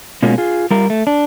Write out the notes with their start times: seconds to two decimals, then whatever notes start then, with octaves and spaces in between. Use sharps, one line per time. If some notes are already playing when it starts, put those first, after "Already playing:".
0.23 B2 G#3 A#3 C#4 F4 F#4
0.38 F4 G#4
0.71 G3 F4 A#4
0.90 A3
1.07 D4